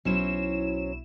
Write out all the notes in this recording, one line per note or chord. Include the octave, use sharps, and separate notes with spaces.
B1 F#3 C#4 E4 C5 E7